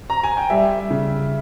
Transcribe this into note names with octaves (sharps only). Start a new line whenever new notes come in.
A#5
G#5
G5
G3 E5
C#3